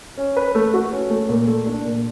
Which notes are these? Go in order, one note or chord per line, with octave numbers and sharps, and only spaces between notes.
C#4
B4
A3
F#4
C#4
A3
A#2
A3
D4
A#2